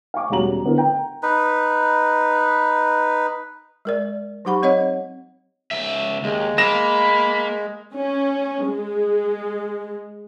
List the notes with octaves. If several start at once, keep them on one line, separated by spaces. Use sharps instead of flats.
F5 G#5 C#6 D6
E1 G3 C#4 F#4 A#5 F#7
D3 B3 E4 A#4
G5 A#5
D#4 B4
G#3 A#4 D5
F#3 D#4 G4 F#5 B5 C#6
C4 C#5 D#5 F#5
C#2 E5
D#2 G#3
A#3 B5 A#6 E7
C#4
G#3